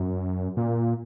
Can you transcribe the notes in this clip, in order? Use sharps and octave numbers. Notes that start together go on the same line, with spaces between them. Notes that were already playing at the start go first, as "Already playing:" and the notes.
Already playing: F#2
A#2